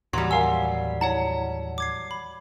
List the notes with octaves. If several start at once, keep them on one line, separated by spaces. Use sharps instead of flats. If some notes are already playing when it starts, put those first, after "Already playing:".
D#2 A2 E3 F#3 G3 C6 C#6
A#4 F5 F#5 G#5 C6 E6
E4 C#5 F#5 A5
D6 G#6 C7
B5